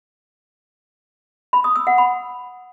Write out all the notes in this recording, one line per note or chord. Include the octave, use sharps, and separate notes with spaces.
B5
D#6
E6
F#5
B5